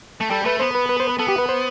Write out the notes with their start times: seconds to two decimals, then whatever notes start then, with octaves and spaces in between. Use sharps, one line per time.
0.20 A3
0.30 G3 A4
0.45 A3 B4
0.60 B3 C5
0.75 B4
0.89 B4
1.00 C5
1.09 B4
1.19 B3 A4
1.28 G4
1.38 B4
1.49 C5